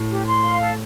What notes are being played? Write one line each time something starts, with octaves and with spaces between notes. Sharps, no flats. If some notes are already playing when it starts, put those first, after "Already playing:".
Already playing: A2
G4
C6
F5
A4